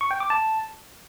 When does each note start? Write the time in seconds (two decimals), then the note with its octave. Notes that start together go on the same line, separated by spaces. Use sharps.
0.01 C#6
0.11 G5
0.20 D6
0.30 A5